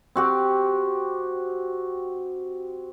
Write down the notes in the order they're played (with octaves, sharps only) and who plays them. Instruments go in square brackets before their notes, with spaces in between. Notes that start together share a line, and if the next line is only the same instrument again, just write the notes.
[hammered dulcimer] C4 F#4 G4